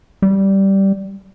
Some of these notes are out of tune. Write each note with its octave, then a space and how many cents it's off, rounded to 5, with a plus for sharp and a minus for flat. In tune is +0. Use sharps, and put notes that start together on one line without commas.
G3 -10